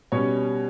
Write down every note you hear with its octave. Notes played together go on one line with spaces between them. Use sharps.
B2 G3 C#4 C#5